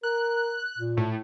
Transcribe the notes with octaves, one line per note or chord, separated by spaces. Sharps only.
A#4 F#6
A#2
A2